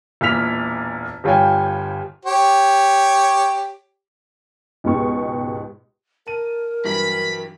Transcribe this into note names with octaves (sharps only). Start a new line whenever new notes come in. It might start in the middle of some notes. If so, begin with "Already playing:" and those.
E1 A#2 E3 F6 B6 F7
G1 G3 F4 C#5 G5 G#5
G4 C#5
C#2 G#2 B2 G#3 G4 C#6
A#4 A5 D#7
G2 E3 F#3 B5